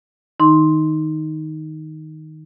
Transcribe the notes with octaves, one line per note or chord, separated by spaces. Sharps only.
D#3 D#4 C6